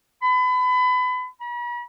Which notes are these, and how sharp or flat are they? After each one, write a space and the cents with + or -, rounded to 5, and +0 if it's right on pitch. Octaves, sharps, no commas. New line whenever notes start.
B5 +30
B5 -45